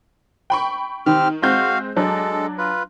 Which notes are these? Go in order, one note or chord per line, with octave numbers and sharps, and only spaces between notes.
G5 B5 C#6
D#3 C4 G4 F6
G#3 C4 F#4 F5 G6
F#3 G#3 D4 A4
F4 B4